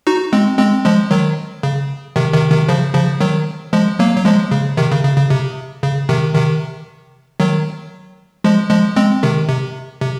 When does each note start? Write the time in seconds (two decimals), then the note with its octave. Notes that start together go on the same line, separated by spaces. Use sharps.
0.07 D#4 F#4
0.33 G#3 C4
0.59 G#3 C4
0.85 F3 G#3
1.11 D#3 F#3
1.63 C#3
2.16 C3 D#3
2.33 C3 D#3
2.51 C3 D#3
2.69 C#3 F3
2.95 C#3 F3
3.21 D#3 F#3
3.73 F3 G#3
3.99 F#3 A#3
4.16 F#3
4.25 F3 G#3
4.51 C#3
4.77 C3 D#3
4.91 C#3
5.04 C#3
5.17 C#3
5.30 C3
5.83 C#3
6.09 C3 D#3
6.35 C3 D#3
7.40 D#3 F#3
8.44 F3 G#3
8.70 F3 G#3
8.96 G#3 C4
9.23 C3 D#3
9.49 C3
10.01 C3